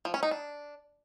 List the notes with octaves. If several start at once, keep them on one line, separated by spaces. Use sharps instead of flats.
F3
C#4
D#4
D4